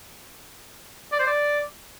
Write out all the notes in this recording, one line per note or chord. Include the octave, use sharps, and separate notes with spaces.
D5
C5
D5